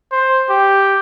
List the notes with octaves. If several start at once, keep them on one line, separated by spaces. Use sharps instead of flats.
C5
G4